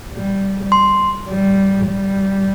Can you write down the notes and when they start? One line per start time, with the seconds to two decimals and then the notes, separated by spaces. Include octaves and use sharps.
0.14 G3
0.72 C6
1.29 G3
1.87 G3